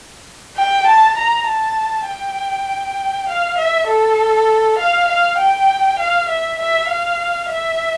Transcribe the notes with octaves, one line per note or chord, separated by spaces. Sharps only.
G5
A5
A#5
A5
G5
F5
E5
A4
F5
F5
G5
F5
E5
E5
F5
E5